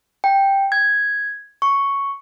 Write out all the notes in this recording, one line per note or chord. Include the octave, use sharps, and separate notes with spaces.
G5
G#6
C#6